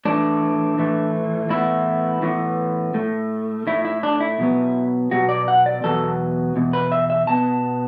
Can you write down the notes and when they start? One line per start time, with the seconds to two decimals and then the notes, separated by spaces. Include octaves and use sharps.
0.05 A2 E3 A3 D4
0.78 A2 E3 A3
1.49 A2 E3 B3 E4
2.22 A2 E3 B3
2.94 A2 A3
3.67 A2 A3 E4
3.85 E4
4.03 D4
4.20 E4
4.39 B2 F#3 B3
5.11 B2 F#3 B3 F#4
5.29 D5
5.48 F#5
5.66 D5
5.84 E2 B2 F#3 B3 A4
6.56 E2 B2
6.73 B4
6.92 E5
7.10 E5
7.27 B2 B3 A5